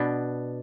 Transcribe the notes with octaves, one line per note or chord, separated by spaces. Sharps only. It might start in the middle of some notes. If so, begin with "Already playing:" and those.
Already playing: B2 B3 D4